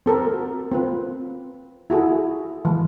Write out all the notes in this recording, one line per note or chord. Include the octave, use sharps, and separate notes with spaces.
C4 A4 A#4
F#4
C4 F4 B4
E4 F#4 G#4 A4
E3 G#3